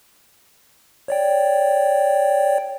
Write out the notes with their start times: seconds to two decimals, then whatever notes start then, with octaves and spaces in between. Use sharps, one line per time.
1.08 C#5 D5 G5